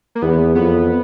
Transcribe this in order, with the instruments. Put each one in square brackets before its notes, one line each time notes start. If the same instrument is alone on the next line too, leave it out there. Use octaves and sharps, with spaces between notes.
[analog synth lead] A#3
[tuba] E2 [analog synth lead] B3
[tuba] F2 [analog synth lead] B3